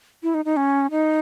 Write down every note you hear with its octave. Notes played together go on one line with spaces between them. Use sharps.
E4
D#4
D#4
C#4
D#4